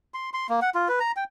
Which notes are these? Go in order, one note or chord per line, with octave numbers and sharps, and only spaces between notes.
C6
C6
A#3
F#5
F4
B4
A#5
G5